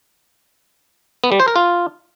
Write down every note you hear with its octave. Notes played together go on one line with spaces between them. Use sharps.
B3
G3
C5
A#4
F4